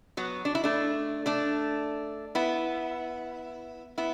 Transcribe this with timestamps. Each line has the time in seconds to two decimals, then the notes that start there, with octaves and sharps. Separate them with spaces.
0.17 F#3 B3
0.45 D4
0.55 E4
0.64 A3 D4
1.26 A3 D4
2.35 B3 E4
3.98 B3 E4